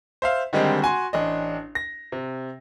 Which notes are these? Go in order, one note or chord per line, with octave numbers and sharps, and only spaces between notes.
C5 E5 F5
D3 D#3 G3 G#3 C4
F#4 G#5 C6
A1 D4 D#5
A#6
C3